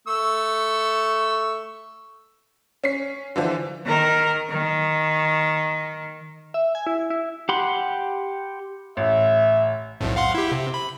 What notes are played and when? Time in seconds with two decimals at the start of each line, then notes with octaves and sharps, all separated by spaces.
0.08 A3 C#6 E6
2.84 C#4 B6 C7
3.36 D3 E3 F3
3.85 D#3 A#4
4.50 D#3
6.54 E5
6.75 G#5
6.87 E4
7.10 E4
7.49 G4 F#5 B5 C6
8.97 A1 E5
10.01 B1 F2 A2
10.16 F5 F#5 C6
10.35 E4 G4
10.52 C3
10.74 B5